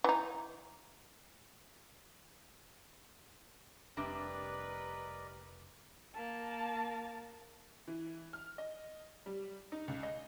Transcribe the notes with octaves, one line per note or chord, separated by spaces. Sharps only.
E3 D#4
F1 C3 G3 D4 A#4 B4 D5 D#5
A#3 A5
E3
F6
D#5
G3
D#4
C#2
D#5